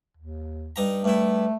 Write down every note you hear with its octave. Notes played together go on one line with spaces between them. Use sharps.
D#2
G2 D#4 A#5
G2 A3 E4